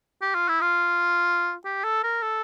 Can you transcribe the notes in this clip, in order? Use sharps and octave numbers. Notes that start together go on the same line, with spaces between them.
G4
F4
E4
F4
G4
A4
A#4
A4